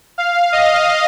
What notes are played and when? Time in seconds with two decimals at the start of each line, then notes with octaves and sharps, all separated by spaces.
0.18 F5
0.52 D#5